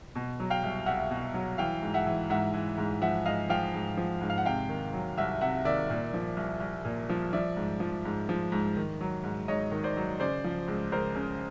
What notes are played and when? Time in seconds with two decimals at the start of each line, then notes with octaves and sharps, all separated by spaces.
0.15 B2
0.40 F#3
0.50 F5 G5
0.63 C2
0.86 C2 E5 F#5
1.11 B2
1.34 F#3
1.58 E3 F5 G5
1.83 G#2
1.94 E5 F#5
2.06 E3
2.30 G#2 E5 F#5
2.54 E3
2.78 G#2
3.02 F3 E5 F#5
3.26 G#2 D#5 F5
3.49 F3 F5 G5
3.74 G#2
3.97 F3
4.21 G#2
4.30 F5
4.38 F#5
4.45 C3 F5 G5
4.69 D#3
4.93 F#3
5.18 C2 E5 F#5
5.41 C3 E5 F#5
5.65 D#3 D5 E5
5.90 A#2
6.14 F3
6.37 C2
6.60 C2
6.85 A#2
7.09 F3
7.33 F3 D5 E5
7.57 G#2
7.80 F3
8.05 G#2
8.29 F3
8.52 G#2
8.77 D#3
9.01 F#3
9.24 G#2
9.48 G#2 C#5 D#5
9.72 D#3
9.84 C5 D5
9.97 F#3
10.20 C#3 C5 D5
10.44 F3
10.68 C#2
10.92 C#2 A#4 C5
11.15 C#3